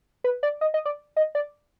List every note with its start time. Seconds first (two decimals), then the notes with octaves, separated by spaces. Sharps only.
0.24 B4
0.43 D5
0.61 D#5
0.74 D#5
0.85 D5
1.17 D#5
1.35 D5